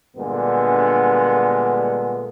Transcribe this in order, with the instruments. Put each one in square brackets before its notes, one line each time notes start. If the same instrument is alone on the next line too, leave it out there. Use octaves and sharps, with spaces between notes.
[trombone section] G2 A#2 D3 G#3 B3